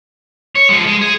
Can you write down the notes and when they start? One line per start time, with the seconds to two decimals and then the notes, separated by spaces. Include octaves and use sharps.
0.55 C#5
0.69 F3 G#3
0.87 G#3
1.01 G#4